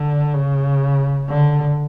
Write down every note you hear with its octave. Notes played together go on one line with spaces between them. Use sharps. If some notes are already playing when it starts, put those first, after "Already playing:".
Already playing: D3
C#3
D3